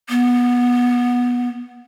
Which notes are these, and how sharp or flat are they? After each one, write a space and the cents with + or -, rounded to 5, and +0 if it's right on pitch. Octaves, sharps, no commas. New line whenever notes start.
B3 -15